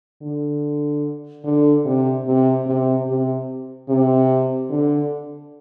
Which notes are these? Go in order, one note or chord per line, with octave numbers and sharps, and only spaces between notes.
D3
D3
C3
C3
C3
C3
C3
D3